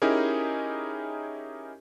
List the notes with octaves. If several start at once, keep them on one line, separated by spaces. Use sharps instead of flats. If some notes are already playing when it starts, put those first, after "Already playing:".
C#4 D#4 E4 G4 G#4 A#4